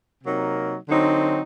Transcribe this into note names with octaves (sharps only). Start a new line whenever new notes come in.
C3 F#3 A#3 D#4
D3 F#3 C4 D#4